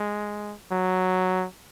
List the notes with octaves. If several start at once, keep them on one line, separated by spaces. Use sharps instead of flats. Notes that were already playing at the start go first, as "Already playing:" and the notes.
Already playing: G#3
F#3